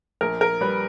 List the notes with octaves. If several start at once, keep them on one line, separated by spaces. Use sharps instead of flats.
A#1 A#4
A#4
G3 B4